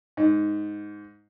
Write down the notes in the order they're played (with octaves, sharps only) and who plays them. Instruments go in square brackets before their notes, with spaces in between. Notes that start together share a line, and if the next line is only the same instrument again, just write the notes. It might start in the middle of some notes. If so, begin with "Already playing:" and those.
[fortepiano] G#2